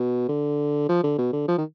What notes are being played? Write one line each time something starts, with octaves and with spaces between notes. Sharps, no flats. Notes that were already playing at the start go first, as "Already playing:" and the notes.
Already playing: B2
D3
F3
D3
B2
D3
F3
D#3